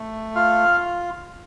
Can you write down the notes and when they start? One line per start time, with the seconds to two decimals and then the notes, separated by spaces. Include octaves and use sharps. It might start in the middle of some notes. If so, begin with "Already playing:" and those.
Already playing: A3
0.35 F4 F5